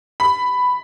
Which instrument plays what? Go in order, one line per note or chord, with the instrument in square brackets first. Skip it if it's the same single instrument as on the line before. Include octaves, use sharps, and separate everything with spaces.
[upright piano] B5